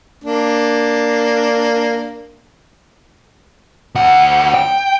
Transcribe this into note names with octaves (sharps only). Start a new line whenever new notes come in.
A#3 D4
D2 F#5
G5